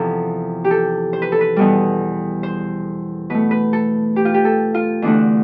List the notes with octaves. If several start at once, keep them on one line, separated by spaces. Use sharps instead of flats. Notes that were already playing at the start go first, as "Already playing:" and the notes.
Already playing: E2 C3 F3 A4
G4
A4
C5
B4
A4
B4
E2 B2 G3
C5
B2 A3 B4
B4
A4
G4
F4
G4
A4
F4
E2 D3 A3 D4